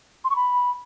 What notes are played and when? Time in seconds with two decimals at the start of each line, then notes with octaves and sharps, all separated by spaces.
0.24 C6
0.29 C#6
0.35 B5